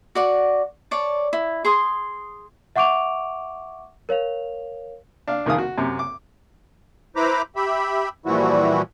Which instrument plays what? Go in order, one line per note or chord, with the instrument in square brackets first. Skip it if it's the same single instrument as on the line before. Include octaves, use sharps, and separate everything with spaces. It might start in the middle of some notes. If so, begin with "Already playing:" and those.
[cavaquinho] F#4 D5 F#5
C#5 D5 A5
E4
G#4 C6 D#6
[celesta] E5 F#5 C#6 D6 D7 F7
A#4 C#5 F5 F7
[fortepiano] D4 F5
C2 F2 D#3 G#4 F5 D#6
F#4
F#2 C3
D6
[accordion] E4 B4 C5 A#5 B5 D6
G4 E5 B5
A#2 E3 F3 G3 E4 F#4